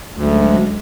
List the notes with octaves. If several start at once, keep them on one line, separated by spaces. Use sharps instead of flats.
D2 F#3 G#3 C#4